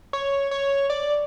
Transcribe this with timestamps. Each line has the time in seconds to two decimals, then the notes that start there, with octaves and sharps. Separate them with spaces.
0.13 C#5
0.51 C#5
0.90 D5